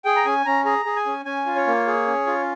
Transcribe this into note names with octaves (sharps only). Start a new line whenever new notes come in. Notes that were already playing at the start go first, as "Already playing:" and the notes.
G#4 G5
A#5
C#4 G#5
C#4 A#5
G#4 A#5
G#4
G#5
C#4
C#4 G#5
F4
C#5
A#3
G#4
C#4
F4